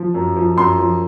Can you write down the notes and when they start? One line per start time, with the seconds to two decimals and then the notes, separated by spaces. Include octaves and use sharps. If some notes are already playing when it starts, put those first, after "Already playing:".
Already playing: F3
0.14 F#2
0.36 F3
0.57 F#2 C6
0.78 F3